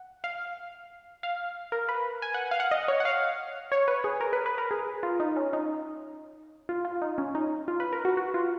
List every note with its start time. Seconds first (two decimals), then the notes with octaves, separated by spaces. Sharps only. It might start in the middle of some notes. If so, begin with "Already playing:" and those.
Already playing: F#5
0.24 F5
1.23 F5
1.72 A#4
1.89 B4
2.22 G#5
2.34 F#5
2.51 F5
2.60 F#5
2.71 D#5
2.88 C#5
3.00 F#5
3.05 F5
3.72 C#5
3.88 B4
4.04 G#4
4.21 A#4
4.33 B4
4.46 B4
4.58 A#4
4.71 G#4
5.03 F4
5.20 D#4
5.37 C#4
5.53 D#4
6.69 F4
6.85 F4
7.02 D#4
7.18 C#4
7.35 D#4
7.68 F4
7.80 B4
7.93 A#4
8.05 F#4
8.17 F#4
8.34 F4